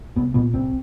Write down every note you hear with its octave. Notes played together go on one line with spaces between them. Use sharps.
C2 B3
A#2 B3
C2 C4